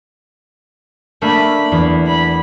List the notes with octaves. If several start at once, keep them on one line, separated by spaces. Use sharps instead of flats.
A3 A#3 D4 B5
E2
B5